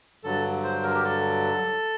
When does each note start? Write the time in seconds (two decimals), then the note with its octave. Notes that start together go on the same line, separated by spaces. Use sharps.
0.24 G2 D3 F#3 A4
0.64 C5
0.83 A#4
0.94 G4
1.04 A4